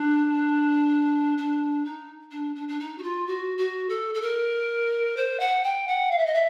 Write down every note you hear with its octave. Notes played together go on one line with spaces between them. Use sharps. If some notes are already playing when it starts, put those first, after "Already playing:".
Already playing: D4
D4
D#4
D4
D4
D4
D#4
F#4
F4
F#4
F#4
A4
A4
A#4
C5
F#5
G5
F#5
F5
E5
D#5
E5